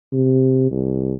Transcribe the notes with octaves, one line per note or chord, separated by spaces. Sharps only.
C3
C2